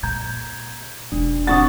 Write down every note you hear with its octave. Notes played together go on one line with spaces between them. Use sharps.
A#2 A#5 G6 G#6
E1 D4
C3 D4 F#5 C#6 D#6 A6